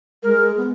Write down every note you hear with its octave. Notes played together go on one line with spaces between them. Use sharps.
G#3 A#4
B3